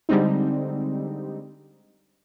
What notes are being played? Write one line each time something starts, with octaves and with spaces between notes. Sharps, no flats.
D3 G3 G#3 C4 D#4